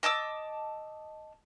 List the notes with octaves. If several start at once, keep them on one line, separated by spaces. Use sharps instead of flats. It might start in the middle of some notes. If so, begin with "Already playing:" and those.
D#5 A5 D6 E6